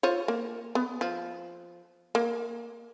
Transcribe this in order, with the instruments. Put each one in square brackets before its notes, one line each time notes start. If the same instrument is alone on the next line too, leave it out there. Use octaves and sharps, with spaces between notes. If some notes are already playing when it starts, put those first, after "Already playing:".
[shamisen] F4 C5 C#5
A#3
B3
F3
A#3